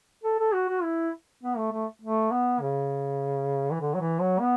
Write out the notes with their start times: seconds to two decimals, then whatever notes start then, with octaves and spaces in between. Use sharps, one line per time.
0.24 A4
0.39 A4
0.53 F#4
0.68 F#4
0.83 E4
1.43 B3
1.57 A3
1.72 A3
2.02 A3
2.31 B3
2.61 C#3
3.71 E3
3.81 D3
3.95 F#3
4.00 E3
4.20 F#3
4.40 B3